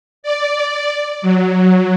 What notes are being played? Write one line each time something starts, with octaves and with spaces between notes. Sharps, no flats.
D5
F#3